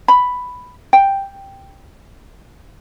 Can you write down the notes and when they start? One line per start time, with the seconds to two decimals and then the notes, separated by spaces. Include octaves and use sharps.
0.08 B5
0.93 G5